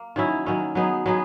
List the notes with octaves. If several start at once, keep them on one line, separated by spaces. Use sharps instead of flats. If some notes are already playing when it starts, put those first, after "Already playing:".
Already playing: A#3
D#3 F#3 C#4 E4
D#3 F#3 C#4 E4
F#3 B3 D#4 G#4
F#3 B3 D#4 G#4